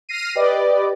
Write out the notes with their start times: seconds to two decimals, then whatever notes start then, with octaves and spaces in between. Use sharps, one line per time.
0.09 F6 A#6 C7 D#7
0.35 G4 B4 D5 D#5